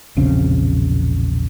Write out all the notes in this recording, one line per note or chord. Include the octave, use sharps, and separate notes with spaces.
E1 A#1 C#3 C4